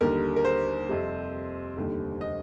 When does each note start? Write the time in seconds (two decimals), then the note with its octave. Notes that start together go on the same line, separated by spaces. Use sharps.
0.01 D#2 D3 G3 A#4
0.36 A#4
0.45 C5
0.89 F2 C3 G3
1.77 F1 D#2 D3 G3
2.21 D#5